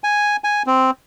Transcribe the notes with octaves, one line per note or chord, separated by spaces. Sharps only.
G#5
G#5
C4